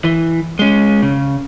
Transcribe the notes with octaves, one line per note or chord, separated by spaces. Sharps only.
E3
G#3 C#4
C#3